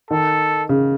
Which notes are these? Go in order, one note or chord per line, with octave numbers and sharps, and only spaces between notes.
D#3 A4
C#3